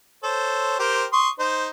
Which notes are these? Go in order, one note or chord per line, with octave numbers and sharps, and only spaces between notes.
A4 C5 C#5
G4 A#4 C5
C6 C#6 D#6
D#4 C5